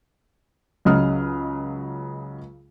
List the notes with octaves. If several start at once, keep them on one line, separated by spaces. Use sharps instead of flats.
C#2 C#3 F#3 D#5 D#6 F6